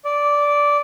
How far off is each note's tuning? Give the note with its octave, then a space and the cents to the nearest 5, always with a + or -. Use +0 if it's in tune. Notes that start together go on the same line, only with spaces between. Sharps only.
D5 -10